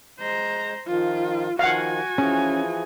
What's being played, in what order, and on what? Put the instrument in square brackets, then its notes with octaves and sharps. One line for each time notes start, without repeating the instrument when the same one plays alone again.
[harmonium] G#3 [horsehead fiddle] C5 A#5
[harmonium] D#3 F3 [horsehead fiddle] F4
[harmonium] D#3 F3 [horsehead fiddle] F#4 G#5 [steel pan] F5 F#5
[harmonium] E3 F3 G#4 [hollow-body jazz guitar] C#4